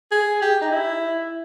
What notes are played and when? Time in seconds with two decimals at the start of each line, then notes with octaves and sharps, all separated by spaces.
0.12 G#4
0.42 G4
0.61 D#4
0.72 E4